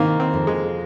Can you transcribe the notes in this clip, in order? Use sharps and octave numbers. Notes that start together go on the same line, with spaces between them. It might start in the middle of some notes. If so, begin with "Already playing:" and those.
Already playing: D#3 A#3 C4 D#4
C4
F2
G#3